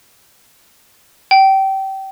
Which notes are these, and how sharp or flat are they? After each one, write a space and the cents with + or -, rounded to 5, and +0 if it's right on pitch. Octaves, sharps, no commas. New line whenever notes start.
G5 -25